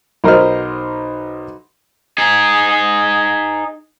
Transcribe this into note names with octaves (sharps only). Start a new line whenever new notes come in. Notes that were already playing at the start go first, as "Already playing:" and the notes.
B1 A#4 C5 D#5 F6
D#4 G#4